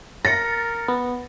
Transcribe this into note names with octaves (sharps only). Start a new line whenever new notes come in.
A#4 A6 A#6 C#7
B3